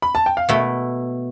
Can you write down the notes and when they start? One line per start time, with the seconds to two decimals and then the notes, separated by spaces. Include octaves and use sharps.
0.02 B5
0.15 A5
0.26 G5
0.37 F5
0.49 B2 A3 E4 E5